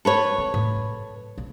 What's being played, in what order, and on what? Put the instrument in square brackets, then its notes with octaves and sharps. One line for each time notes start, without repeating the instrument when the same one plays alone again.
[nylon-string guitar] A4 B4 C#5
[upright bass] C4
A2
F#3
A#1